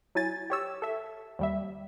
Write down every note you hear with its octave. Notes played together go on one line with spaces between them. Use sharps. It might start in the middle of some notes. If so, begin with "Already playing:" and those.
F#3 E4 G#5 A6
G4 C#5 E6
A4 E5
D#2 G3 E5